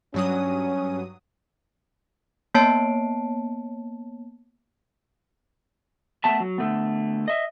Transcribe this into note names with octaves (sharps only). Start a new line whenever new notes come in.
G2 F#3 C#4 D#6
A#3 B3 C#5 A5 C7 D7
A3 B3 E5 A5
F#3
D3 A3 B3
D#5 E5